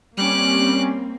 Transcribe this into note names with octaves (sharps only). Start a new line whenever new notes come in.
G3 A#3 C4 C#4 D6 F#6